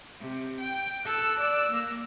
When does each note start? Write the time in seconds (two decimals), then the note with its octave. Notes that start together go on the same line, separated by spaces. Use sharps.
0.20 C3
0.60 G5
1.05 A4 E6 F#6
1.40 D5
1.71 A#3